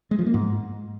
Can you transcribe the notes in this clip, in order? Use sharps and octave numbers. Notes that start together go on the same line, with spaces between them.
G#3
F3
A#3
G#2